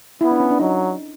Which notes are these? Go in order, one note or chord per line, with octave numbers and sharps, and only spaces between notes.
B3 E4
D4
C#4
D4
F#3 D#4